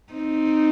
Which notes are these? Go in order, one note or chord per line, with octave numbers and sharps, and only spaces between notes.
C4 D#4